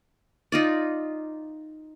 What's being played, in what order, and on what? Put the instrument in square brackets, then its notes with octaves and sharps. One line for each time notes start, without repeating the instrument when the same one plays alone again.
[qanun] D#4 F4 D5